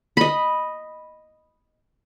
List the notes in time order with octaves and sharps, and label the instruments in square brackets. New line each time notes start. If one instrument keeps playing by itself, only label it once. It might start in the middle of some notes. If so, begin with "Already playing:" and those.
[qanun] D#5 B5